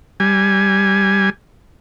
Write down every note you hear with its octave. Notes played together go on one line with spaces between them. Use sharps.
G3 G#5